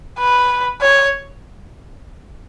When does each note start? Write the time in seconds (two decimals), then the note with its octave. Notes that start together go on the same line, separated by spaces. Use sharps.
0.18 B4
0.82 C#5